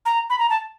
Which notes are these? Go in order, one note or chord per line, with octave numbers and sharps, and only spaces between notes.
A#5
B5
A#5
A5